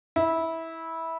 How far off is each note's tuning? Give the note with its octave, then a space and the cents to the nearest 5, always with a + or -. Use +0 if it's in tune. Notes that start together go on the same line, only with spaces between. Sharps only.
E4 -15